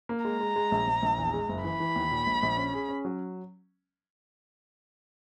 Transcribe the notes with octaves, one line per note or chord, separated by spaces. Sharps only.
A#3
G#3 A#5
G#3
G#3
A#1
A#1
A#1
E2
G#3
F#1
E3 B5
E3
D#2
A#2
A#1
A#1
C#4
G#4
C#4
F#3